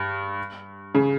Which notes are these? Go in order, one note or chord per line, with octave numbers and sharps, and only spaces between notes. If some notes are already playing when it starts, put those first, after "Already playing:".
Already playing: G2
C#3